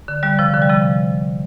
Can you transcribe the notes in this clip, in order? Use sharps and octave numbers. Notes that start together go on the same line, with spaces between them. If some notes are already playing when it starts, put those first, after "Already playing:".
D3
D3 G3
C3 F3
D3
G3
C3 F3